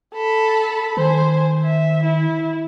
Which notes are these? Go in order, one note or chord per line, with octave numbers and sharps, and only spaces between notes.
A4 B5
D#3 C5 G#5
E5
E4